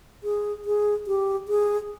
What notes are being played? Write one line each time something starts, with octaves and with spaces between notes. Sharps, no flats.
G#4
G#4
G4
G#4